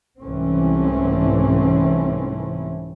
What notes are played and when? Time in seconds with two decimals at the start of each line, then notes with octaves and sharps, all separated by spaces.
0.22 C2 G#2 E3 A3 C4 C#4